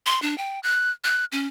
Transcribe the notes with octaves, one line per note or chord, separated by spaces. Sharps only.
C6
D4
G5
F#6
F#6
C#4